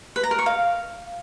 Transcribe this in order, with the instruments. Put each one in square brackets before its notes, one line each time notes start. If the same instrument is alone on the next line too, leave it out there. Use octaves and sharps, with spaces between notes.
[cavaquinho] B4
A#5
A#4
C#6
F5